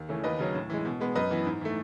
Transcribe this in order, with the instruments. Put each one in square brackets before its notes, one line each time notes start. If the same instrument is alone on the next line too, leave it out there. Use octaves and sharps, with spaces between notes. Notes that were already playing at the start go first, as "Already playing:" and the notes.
Already playing: [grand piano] D#2
C#3 E3 A3 C#4
D#2 B4 D#5
C#3 F#3 C#4
A2
E3 G#3
B2
G#3 B3
F#2 B4 D#5
E3 B3
G#2
E3 A3